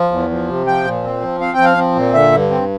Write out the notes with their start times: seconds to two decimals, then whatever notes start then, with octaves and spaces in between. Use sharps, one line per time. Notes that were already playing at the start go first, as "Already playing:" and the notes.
Already playing: F3
0.12 E2
0.30 F3
0.48 C3
0.67 F3 G5
0.85 A#2
1.04 C4
1.22 F3
1.40 C4 F5
1.53 G5
1.58 F3
1.65 F5
1.77 C4
1.95 A#2
2.14 D3 E5
2.32 G2
2.50 C4